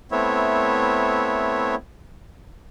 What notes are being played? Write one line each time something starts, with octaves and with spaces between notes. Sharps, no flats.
A3 B3 C4 E4 C#5 E5